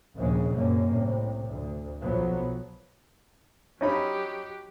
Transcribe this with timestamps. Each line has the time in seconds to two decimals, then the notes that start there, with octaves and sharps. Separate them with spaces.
0.16 F1 A#1 D#2 C#3 G#3
0.52 C2 F#2 A#2 A#3 C#4
0.88 C2 A2 C3
1.49 D2
2.01 B1 F3 F#3 B3
3.81 F#3 C#4 D#4 G4 B5